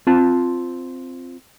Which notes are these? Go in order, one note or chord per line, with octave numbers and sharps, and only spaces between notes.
C4 F4 A5